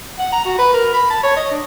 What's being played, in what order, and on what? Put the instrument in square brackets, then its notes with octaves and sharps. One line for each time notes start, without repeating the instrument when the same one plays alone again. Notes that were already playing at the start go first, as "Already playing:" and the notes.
[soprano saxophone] F#5
A#5
F#4
B4
A#4
B5
A5
C#5
D#5
D4